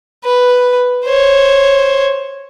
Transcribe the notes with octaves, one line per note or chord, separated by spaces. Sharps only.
B4
C5 C#5